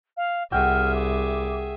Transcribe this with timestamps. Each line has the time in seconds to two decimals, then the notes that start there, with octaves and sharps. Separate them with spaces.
0.17 F5
0.52 C2 F#4 G#4 E5 G5 F6
0.95 D6